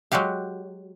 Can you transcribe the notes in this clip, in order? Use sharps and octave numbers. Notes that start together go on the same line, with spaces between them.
F#3 G#3 F#4 G4 F5